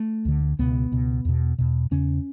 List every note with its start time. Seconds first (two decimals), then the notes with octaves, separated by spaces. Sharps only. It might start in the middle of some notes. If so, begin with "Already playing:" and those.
Already playing: A3
0.25 D2 D3
0.59 C#2 B2 B3
0.91 C#2 B2
1.25 E2 B2
1.58 E2 B2
1.91 E2 C#3 C#4